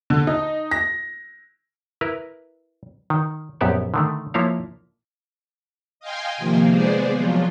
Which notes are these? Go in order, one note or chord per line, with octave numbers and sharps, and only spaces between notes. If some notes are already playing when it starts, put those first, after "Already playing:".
D3
D#4
A#6
E4 A#4 B4
D#3
A#1 F#2 B3 G4 E5 F#5
D3 D#3 A3
F3 A#3 E4 C#5 F5
D#5 F5 G5 G#5 C6
C3 D#3 F3 A#3
G#3 B3 G#4 C5 D5
F3 F#3 F4